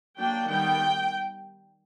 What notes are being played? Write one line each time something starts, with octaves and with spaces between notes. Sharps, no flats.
F#3 A#3 D4 G5
D#3 G3 B3 G5